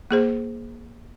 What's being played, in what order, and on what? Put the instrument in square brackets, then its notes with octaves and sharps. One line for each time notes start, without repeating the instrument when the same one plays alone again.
[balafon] A#3 G#4 C5